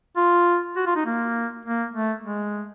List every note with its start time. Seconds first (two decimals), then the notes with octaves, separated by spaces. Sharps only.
0.17 F4
0.76 F#4
0.86 F4
0.96 D#4
1.06 A#3
1.65 A#3
1.93 A3
2.24 G#3